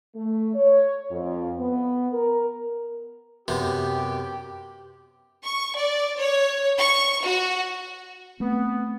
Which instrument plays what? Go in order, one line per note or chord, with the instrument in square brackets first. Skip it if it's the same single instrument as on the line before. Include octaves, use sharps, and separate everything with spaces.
[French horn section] A3
C#5
F2
B3
A#4
[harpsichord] F#2 C3 B3 [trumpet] G4
[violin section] C#6
D5
C#5
C#6
F#4
[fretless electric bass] A3 C4 [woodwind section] B3